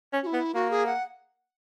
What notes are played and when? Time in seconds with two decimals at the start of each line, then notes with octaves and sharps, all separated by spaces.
0.13 C#4
0.23 F#4
0.27 E4
0.33 B3
0.55 A#3 F#4
0.71 G#4
0.86 F#5